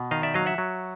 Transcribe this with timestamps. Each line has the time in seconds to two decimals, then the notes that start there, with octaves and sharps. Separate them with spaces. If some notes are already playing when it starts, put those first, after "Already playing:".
Already playing: B2
0.11 D#3 D#5 F5
0.23 D5 E5
0.34 F#3 D#5 F5
0.46 E5 F#5
0.58 F#3